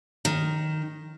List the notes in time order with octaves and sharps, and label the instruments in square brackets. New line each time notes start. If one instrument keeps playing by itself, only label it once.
[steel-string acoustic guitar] D#3